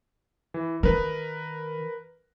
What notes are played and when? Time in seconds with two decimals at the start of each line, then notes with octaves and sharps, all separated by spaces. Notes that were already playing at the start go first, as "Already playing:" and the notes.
0.54 E3
0.83 D#3 A#4 B4